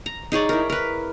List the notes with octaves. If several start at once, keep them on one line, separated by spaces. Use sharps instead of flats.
A#5
D#4 G#4 C#5 D5
E4 A#4
A#4 B4